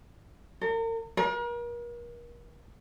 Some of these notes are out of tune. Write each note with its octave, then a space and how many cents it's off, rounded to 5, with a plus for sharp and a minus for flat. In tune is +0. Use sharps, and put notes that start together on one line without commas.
A#4 -40
A#4 +40